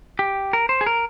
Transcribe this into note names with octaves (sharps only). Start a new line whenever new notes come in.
G4
A#4
C5
G#4
A#4